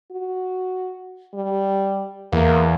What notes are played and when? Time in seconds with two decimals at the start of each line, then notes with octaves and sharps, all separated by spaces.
0.12 F#4
1.34 G3
2.33 E2 A#3